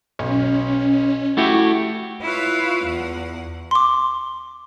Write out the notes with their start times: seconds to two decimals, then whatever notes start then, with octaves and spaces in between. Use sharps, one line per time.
0.19 B1 C#4
1.37 A3 E4 F#4 G4
2.22 E4 F4 B4 C#5 F5
2.84 E2 F#5
3.71 C6 D6